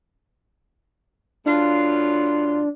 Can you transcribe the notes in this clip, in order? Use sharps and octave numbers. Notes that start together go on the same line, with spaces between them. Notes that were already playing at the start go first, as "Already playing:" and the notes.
A2 F#3 D4 F4